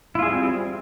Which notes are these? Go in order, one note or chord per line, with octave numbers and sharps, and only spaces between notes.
G3 C4 E4 F4 G#4